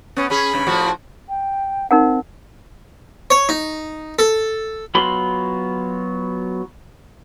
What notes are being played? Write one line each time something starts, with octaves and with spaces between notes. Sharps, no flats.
B3 C#4
C#4 G#4 B5
G2 C#3
A2 F3 F#4
G5
C4 D#4 A#4 F#5
C#5
D#4
A4
F#3 B3 F4 B5 C6